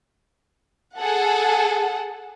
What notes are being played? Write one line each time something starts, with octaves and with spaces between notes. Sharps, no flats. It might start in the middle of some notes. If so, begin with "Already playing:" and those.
G#4 A4 F#5